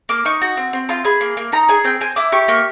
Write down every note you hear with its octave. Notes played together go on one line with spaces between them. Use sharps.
A#3 D6
D#4 C#6
F#4
C4
C4
F4 C6
G#4 B5
A#3
A#3
D#4 A#5
G#4 G#5
C4 G5
C4 G#5
E4 D6
G4 C#6
A#3 C#6